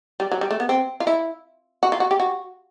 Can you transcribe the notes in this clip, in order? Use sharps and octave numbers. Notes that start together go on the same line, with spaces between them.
G3
F#3
G3
A3
B3
C4
F4
E4
F#4
F4
F#4
G4
F#4